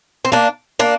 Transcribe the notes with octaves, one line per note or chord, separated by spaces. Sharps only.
C4
A#3 D4
A#3 D4